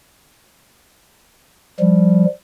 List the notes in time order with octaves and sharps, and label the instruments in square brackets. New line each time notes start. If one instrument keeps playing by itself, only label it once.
[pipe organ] F3 G3